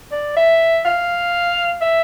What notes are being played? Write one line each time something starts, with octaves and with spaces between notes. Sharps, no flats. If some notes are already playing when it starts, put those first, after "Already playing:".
D5
E5
F5
E5